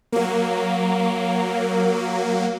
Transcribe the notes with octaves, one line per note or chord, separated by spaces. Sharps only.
F#3 A#3